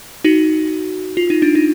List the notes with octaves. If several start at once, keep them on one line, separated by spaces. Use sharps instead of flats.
D#4 F#4
F4
D#4
D4
D#4